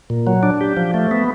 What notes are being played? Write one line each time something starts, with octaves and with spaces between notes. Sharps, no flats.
A#2
F#3
D4
G4
F3
A3
B3